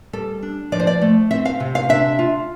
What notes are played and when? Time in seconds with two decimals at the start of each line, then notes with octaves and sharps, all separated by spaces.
0.13 G3 A4
0.43 D4
0.72 F3 D5
0.80 C5
0.87 D5
1.02 A3
1.31 C4 E5
1.45 F5
1.60 C3
1.75 F5
1.89 D4 E5
2.19 F4